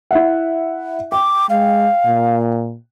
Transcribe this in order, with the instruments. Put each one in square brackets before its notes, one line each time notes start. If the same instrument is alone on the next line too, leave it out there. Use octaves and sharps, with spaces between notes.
[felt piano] E4 E5 F#5
[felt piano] G5 [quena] D6
[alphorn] G#3 [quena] F5
[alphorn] A#2